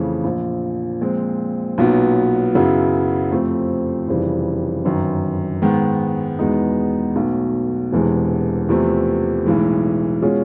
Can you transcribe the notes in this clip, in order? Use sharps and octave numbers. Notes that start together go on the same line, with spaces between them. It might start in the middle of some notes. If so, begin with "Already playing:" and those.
Already playing: F2 C#3 E3 A3
A#1 A#2 F3
A#2 F3 G#3 C4
B1 A#2 F#3 B3
F#2 C#3 F#3 B3 E4
F2 C3 F3 A3 C4
F1 F2 C#3 E3 G3
G1 F#2 D#3
G#2 D#3 G#3 B3
E2 B2 G#3 B3 D#4
B1 B2 F#3 A3
E1 E2 C3 E3 G#3
E2 C3 F3 A3
B1 A2 E3 G#3
B2 G#3 C#4 F4 G#4